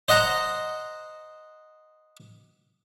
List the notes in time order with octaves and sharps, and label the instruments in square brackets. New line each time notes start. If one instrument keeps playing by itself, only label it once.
[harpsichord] C5 D#5 F#5 A#5